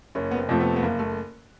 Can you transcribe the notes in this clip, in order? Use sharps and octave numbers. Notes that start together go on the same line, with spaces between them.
F#1 C#4
B3
C4
F2 C3 F3 A3
B3
B3
F#1 A#3
A3